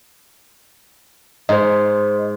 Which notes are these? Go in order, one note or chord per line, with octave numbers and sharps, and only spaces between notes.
G#2 C5 D#5